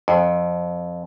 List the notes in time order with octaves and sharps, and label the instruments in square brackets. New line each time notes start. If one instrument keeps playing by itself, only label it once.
[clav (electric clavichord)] F2